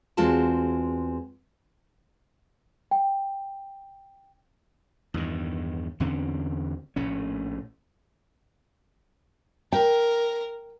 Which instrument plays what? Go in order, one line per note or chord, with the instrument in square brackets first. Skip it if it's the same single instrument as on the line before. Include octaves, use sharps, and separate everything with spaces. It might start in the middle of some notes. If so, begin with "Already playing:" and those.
[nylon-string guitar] E2 G#3 C4 F4 F#4 A5
[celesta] G5
[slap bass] E2 G2 D#3
E2 D3 C4 C#4
A#1 A2 C#4
[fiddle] A#4 [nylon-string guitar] G5